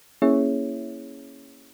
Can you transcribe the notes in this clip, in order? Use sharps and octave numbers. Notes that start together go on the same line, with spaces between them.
A#3 C#4 E4 G#4 C#5 E5